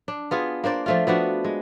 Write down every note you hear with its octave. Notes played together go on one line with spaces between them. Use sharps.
D4
B3 F4 G#4
A#3 D4 C5 D5
F3 A3 F4
F3 B3 D4 F#4
G#3